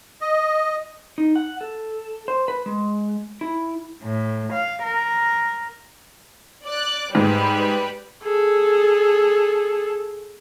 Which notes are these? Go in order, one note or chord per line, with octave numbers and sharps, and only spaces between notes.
D#5
D#4
F#5
A4
C5
B4
G#3
E4
A2
F5
A#4
D5 F#6
G#2 G3 B4
G#4 A4